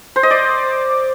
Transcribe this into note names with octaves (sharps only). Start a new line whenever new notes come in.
C5
D#5
D5